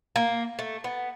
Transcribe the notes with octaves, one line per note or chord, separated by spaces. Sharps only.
A#3
A3
B3